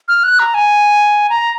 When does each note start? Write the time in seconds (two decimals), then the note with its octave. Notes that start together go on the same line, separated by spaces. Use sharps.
0.08 F6
0.24 F#6
0.39 A#5
0.54 G#5
1.30 A#5